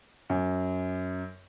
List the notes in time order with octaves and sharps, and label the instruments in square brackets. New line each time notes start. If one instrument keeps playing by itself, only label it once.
[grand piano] F#2